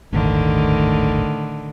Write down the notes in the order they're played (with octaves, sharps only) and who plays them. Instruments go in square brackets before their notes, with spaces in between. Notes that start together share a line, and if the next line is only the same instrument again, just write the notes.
[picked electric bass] D#1 G#1 [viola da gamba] A2 D3 D#3